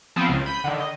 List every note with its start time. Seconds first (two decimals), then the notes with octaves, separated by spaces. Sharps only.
0.16 F3 B3 C4
0.29 C#2 C#3
0.46 B5 G6 D#7
0.64 D3 D#3
0.80 D#5